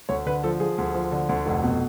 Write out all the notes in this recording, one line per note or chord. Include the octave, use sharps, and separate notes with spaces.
D2 C#5
D3 B4
F3 A4
F3 G#4
D2
F3
D3
D2
F1
B2